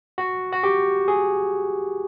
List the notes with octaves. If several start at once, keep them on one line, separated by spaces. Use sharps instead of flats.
F#4
F#4
G4
G#4